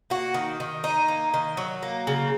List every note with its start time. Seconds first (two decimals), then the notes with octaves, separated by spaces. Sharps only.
0.10 A#3 F#4
0.34 D#3
0.60 D#3
0.83 A#3 D#4
1.08 A#3
1.34 D#3
1.57 F#3
1.83 A#3
2.07 C#3